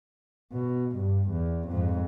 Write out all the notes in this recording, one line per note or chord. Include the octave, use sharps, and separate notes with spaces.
B2
G2
E2
F2 G#2